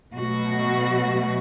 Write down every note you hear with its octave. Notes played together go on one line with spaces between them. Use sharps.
B2 F#3 A3 F#4